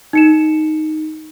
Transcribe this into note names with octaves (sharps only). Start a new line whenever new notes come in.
D#4 C#7 E7